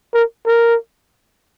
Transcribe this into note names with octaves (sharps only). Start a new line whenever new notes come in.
A#4
A#4